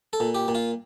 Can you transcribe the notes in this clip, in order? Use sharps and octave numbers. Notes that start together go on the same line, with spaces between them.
A4
A#2
G4
A#2
F4